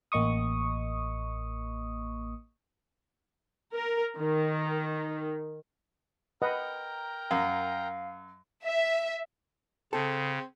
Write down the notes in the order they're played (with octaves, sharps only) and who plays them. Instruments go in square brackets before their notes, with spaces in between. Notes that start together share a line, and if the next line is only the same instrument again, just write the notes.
[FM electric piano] A1 A#3 D#5 C#6 D#6
[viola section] A#4
D#3
[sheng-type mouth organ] A#4 G5 A#5 [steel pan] B4 D#5 F#5
[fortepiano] F#2 [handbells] F5
[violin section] E5
[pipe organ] C#3 [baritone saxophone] C4 [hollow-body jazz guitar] A4